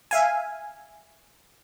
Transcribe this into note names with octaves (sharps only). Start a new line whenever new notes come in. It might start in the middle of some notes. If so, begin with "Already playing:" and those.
E5 F5 G#5